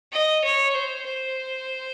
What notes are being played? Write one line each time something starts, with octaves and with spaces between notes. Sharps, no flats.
D#5
C#5
C5
C5